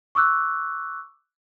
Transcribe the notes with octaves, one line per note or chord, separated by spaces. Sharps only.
C#6 D6 E6 F#6